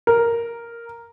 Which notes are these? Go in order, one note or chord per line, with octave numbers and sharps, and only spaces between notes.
A#4